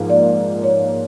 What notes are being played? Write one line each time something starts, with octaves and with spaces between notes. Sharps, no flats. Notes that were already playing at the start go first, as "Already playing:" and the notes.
Already playing: G#2 F3 A#3
D5
C#5